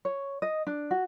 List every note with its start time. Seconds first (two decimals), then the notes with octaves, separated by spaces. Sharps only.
0.05 C#5
0.42 D#5
0.67 D4
0.91 F#4